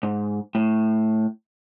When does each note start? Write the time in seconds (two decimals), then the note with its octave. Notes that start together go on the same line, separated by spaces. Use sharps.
0.03 G#2
0.55 A2